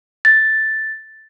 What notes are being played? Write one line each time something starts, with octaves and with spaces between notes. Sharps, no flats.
A6